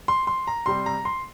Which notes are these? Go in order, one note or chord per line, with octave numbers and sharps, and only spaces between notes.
C6
C6
A#5
C3 G3 C4 C6
A#5
C6